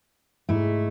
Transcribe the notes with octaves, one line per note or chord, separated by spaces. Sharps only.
G#2 A3 E4